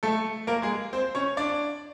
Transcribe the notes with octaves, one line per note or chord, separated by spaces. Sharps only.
A3 A4
A#3 A#4
G#3 G#4
C4 C5
C#4 C#5
D4 D5